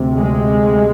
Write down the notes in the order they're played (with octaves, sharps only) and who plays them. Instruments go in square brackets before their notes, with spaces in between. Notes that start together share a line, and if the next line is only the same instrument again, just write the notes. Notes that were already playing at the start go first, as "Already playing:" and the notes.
Already playing: [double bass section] D2 C3
G#3